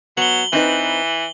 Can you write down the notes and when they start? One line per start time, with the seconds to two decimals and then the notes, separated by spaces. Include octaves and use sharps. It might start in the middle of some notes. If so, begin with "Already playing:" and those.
0.17 F#3 B3 F#7 G7
0.53 E3 C4 D#4 B4